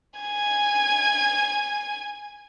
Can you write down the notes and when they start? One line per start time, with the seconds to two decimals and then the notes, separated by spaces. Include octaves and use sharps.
0.20 G#5 G#6